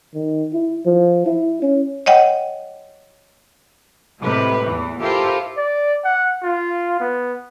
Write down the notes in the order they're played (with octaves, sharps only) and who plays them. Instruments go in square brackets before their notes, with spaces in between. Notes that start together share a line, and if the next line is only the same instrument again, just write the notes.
[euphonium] D#3
E4
F3
E4
C#4
[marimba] C#5 D#5 F#5 G5
[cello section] A2 C3 G#3 G4 B4
E2 E3
E4 F4 G4 A4 A#4 C5
[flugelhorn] D5
F#5
F4
B3